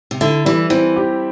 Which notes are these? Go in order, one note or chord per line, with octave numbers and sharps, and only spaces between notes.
C3
D3 E4
E3 G3
E3 C4
G4